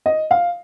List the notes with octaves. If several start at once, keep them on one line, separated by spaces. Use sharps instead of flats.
D#5
F5